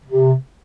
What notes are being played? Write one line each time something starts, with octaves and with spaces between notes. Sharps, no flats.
C3